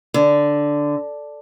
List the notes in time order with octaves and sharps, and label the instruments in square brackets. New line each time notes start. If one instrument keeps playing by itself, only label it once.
[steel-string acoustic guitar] D3